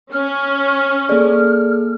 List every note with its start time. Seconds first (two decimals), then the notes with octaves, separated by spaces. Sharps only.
0.12 C#4 F6
1.09 A#3 G#4 A4 D5